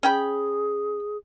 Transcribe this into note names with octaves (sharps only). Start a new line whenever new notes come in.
C#4 G#4 G5 B5